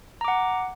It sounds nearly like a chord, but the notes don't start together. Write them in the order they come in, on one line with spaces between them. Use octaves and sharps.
A#5 D6 F#5